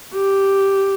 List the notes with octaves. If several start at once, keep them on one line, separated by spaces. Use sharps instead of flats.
G4